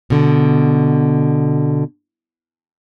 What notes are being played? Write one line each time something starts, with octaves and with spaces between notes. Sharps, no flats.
B2 D3